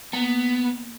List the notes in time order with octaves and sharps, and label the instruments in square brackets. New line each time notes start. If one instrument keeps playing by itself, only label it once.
[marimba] A#3 [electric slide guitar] B3